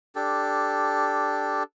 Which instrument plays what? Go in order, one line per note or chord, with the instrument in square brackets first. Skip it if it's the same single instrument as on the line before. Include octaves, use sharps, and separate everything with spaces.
[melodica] D4 G4 A4